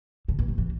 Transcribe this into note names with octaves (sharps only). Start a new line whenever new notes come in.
D3
E3
F3
E3